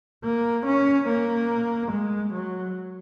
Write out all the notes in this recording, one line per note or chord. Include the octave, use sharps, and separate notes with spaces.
A#3
C#4
A#3
G#3
F#3